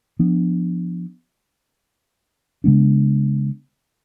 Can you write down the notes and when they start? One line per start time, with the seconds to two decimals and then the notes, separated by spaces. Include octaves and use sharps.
0.19 F3 B3 D4
2.64 C#3 G#3 B3 D4